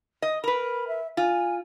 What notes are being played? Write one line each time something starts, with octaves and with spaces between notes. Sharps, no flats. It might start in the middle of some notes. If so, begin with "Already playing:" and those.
D#5
A#4 B4 B5
E5
F4 G#5